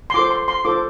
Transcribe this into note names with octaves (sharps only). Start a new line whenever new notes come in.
C6
F4 A4 C5 D6
C6
C6
F4 A4 C5 D6